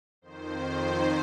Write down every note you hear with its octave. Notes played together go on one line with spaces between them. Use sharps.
F2 D#3 C5